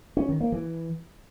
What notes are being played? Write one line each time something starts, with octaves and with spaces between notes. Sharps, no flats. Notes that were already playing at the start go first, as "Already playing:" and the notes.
C#4
D#3
A#3
E3